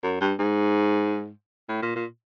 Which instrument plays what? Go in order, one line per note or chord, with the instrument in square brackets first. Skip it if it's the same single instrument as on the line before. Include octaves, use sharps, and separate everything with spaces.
[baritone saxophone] F#2
G2
G#2
A2
A#2
A#2